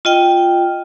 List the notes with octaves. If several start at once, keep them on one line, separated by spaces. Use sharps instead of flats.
F4 D#5 G5